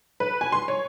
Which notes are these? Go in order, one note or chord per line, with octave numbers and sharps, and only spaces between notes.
B4
G#5
C6
C#5